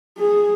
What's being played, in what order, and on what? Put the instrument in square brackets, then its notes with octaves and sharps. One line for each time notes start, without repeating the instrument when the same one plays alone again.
[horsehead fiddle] G#4